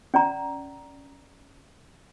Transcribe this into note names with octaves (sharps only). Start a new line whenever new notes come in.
C#4 D5 A#5